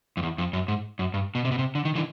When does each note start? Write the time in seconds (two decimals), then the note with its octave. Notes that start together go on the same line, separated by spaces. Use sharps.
0.17 F2
0.23 E2
0.38 F2
0.53 F#2
0.68 G#2
0.99 F#2
1.14 G2
1.35 B2
1.45 C3
1.52 B2
1.59 C3
1.75 D3
1.85 D#3
1.95 D3 E3